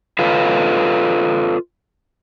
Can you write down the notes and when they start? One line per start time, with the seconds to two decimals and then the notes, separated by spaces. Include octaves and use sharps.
0.19 F4 A4 B4 C#5 D#5 F5